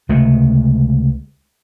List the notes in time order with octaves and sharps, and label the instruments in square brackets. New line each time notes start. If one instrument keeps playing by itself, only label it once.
[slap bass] C#2 C3 G#3 A3